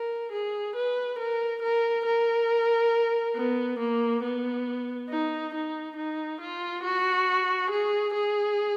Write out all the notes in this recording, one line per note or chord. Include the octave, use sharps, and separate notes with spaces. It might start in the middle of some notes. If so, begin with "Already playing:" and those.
Already playing: A#4
G#4
B4
A#4
A#4
A#4
B3
A#3
B3
D#4
D#4
D#4
F4
F#4
G#4
G#4